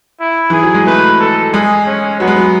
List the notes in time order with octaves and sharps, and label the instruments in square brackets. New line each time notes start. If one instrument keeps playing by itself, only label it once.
[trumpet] E4
[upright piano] E3 [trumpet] G#4
[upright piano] F#3
G#3
[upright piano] A3 [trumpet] B4
[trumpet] A4
[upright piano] G#3 [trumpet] G#4
[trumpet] C#4
[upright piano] F#3 [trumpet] B3
[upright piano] G#3
F#3